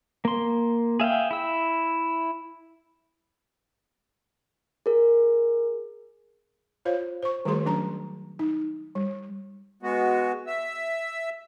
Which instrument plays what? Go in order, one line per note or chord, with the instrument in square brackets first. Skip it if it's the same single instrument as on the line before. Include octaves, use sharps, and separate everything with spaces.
[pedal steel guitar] A#3 C6
G#4 E5 F5 G5
E4 E6
[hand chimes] G#4 A#4
[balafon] F4 C5 C#5 F5
C5 C#6
D#3 G3 A3 F#4 G#4 C6
F#3 C#4 D4 D5 A#5
D#4
G3
[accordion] G#3 B3 F#4
E5 E6